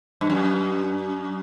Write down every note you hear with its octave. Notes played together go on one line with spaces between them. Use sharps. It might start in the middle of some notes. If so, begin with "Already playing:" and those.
G2
F#2